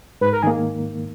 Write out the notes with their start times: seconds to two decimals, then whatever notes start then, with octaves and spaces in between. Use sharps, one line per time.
0.21 G#2 B4
0.33 A#4
0.43 D#3 A#3 G#4